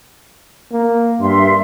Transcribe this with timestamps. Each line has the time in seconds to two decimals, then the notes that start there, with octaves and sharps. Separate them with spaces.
0.72 A#3
1.20 G2 E5 F5 C6